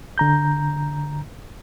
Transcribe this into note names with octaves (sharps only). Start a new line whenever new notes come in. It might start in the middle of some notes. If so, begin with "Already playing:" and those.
D3 A#5 G6